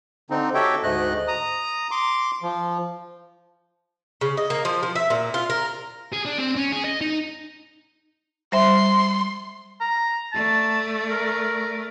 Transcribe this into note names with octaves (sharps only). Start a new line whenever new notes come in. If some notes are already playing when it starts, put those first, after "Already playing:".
D3 C4 D#4
F#4 G4 A4 C#5 E5 G5
D2 G#2 A3 D#5 F#6
A#5 D#6
C6 D6
F3
C#3
D#5
A#3
F3
F3
E5
A#2
F4
A#4
G#4
D4
C4
C#4
G#4
D#5
D#4
G3 C5 E5 C6
A#5
A3 D5 A5
A#4